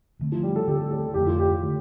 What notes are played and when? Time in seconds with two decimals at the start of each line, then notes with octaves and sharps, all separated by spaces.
0.20 D2 D3 A3 C4
0.32 F3
0.43 G3
0.56 A4
0.67 D2 D3 A3 C4 G4
0.91 A4
1.14 F2 D3 A3 G4
1.27 F4
1.39 G4
1.63 D3 A3